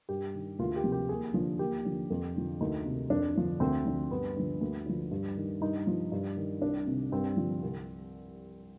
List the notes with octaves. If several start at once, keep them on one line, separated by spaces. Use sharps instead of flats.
G2 G4
D#3
D2 F4
G4
C3 F3
G4
D#2 G#4
D3 F3
D#2 G4
D3 F3
F2
D3 F3
D2 D#4
C3 D#3
F2 D4
D3 F3
D2 C4
D3 F3
G2 B3
D3 F3
D2
D3 F3
G2
D#3
G2 D#4
F3
G2
D#3
C2 D4
C3 D#3
G2 C4
D3 F3
C2